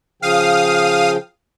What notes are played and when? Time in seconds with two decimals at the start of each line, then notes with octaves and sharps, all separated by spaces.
0.22 C#3 F3 F5 G5 D#6